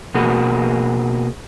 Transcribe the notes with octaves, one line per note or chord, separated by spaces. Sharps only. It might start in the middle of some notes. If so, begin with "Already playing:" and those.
B2 A#3 F#4 G#4